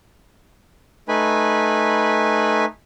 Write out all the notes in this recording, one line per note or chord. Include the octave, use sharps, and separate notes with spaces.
A3 D#4 B4 G#5 B5